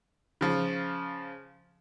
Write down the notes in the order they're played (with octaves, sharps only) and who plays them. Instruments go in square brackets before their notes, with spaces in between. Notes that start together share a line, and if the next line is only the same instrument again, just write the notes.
[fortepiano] C#3 F3